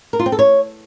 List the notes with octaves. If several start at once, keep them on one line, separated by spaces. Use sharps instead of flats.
A#4
F4
C4
A4
C#5